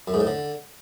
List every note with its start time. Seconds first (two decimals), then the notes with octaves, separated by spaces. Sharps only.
0.08 F#2
0.14 G#2
0.20 A2
0.27 D3